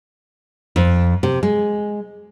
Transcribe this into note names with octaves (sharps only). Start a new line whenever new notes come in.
F2
C3
G#3